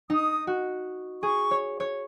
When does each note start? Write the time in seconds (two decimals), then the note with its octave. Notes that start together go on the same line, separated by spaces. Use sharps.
0.10 D#4 D#6
0.47 F#4
1.23 G#4 C#6
1.51 C#5
1.80 C#5